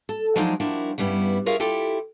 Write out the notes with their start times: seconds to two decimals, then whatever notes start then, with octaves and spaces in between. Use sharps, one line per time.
0.09 A4
0.36 F3 F#3 G#3 D4 D#4 F4
0.60 F3 G3 D4 E4 F#4 A#4
0.98 G2 C#3 G3 B3 E4
1.46 F4 G#4 A#4 C#5 E5 F5
1.60 E4 F4 G4 A4 G5